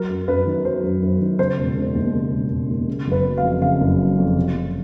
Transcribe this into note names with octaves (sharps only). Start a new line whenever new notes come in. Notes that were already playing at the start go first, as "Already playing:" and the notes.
Already playing: F#3 A#4
F#2
F#2 B4
D#3
F#3 C5
F#2
F#2
D#3
C#3 C5
E1
E1
D#2
C#3
E1
E1
D#2
C#3
F#1 B4
F#3
F5
F2
C#3 F5
F#1
F#3
F2
C3
F#1